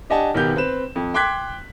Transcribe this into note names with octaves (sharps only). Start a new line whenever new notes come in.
D4 G4 D#5 F#5 G#5 A5
B1 D#3 B3 G4 G6
C4 B4 E7
F2
G5 C6 D6 F#6 G#6 B6